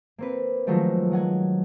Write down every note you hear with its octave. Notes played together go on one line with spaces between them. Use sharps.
A#3 C4 B4
D#3 F3 F#3 G#3 A3
F#3 F#5 G#5